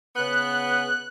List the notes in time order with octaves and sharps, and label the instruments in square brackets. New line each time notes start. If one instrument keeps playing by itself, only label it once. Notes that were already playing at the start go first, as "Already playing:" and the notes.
[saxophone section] C#3 B3 [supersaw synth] F#6